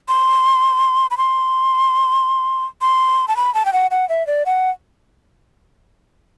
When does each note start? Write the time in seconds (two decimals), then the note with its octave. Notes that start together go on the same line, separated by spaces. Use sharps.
0.08 C6
1.11 B5
1.18 C6
2.81 C6
3.28 A5
3.37 B5
3.54 A5
3.65 G5
3.73 F#5
3.91 F#5
4.09 E5
4.27 D5
4.46 F#5